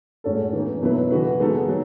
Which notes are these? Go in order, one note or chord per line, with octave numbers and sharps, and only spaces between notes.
A2 G#3 C#4 F#4 A4
E3 B3 D#4
B2 F#3 B3 E4 B4
C#3 E3 B3 F#4 B4
G#3 B3 D#4 A4
F#3